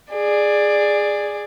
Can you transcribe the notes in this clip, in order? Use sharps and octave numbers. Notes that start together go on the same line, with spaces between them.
G#4 D5